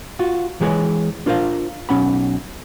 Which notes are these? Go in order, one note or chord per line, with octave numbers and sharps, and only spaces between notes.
F4 F#4
E3 G#3 G4 G#4 B4 C#5
D4 F4 A#4 C5 F5
B1 C#3 C#4 F#5 B5